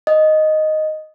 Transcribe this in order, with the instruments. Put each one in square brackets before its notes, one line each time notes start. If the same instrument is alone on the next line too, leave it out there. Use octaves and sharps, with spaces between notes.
[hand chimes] D#5